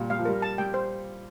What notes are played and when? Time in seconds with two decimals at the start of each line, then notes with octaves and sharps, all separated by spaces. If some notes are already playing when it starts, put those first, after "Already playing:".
Already playing: A#2 G3
0.10 G3 F5
0.19 F3
0.25 G3 A#4
0.42 A5
0.58 G3 G5
0.74 C5